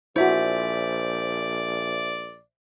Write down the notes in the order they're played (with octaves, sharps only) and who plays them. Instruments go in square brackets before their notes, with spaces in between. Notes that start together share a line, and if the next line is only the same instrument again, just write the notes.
[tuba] A#1 [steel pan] E4 F#4 [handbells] C5 E5 G#5 [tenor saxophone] D5